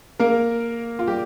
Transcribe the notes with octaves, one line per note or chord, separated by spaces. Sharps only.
A#3 A#4
F4
G3 G4